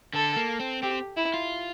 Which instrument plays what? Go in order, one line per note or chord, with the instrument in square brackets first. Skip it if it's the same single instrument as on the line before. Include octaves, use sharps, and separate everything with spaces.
[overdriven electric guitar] D3 [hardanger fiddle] A4
[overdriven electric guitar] A#3
C4
[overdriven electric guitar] C4 [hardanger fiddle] G4
[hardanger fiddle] E4
[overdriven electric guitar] F4